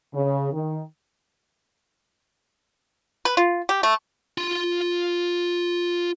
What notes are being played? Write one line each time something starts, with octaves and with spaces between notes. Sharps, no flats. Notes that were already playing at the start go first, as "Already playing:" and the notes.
C#3
D#3
B4
F4
G4
A3
F4 C6